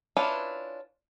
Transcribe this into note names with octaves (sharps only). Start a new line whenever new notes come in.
C#4 D4 E4 F4 B4